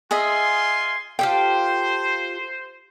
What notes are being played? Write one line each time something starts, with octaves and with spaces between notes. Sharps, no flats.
F4 G#4 D#5 E5 G#5 C6
F4 G4 A4 C5 G5